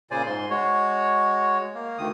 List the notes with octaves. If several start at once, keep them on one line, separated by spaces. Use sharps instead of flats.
A#2 C#3 C5 D5 G#5
G#2 C6
G#3 F#4 C#5
A#3
D2 D#3 D#6